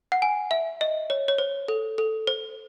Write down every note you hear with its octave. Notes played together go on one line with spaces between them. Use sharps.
F#5
G#5
E5
D#5
C#5
C#5
C5
A4
A4
C5